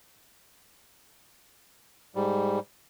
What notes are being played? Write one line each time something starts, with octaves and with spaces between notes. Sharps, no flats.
G#2 G3